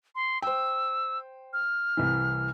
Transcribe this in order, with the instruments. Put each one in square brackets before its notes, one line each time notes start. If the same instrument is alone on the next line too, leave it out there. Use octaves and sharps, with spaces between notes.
[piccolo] C6
[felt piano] C5 G5 [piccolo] E6
[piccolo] F6
[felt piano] C2 E3